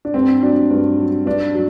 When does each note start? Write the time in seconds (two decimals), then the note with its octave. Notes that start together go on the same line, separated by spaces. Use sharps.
0.05 D4
0.14 G2 C4
0.43 F#3 D4
0.70 G2
0.98 F#3
1.26 G2 D4
1.54 F#3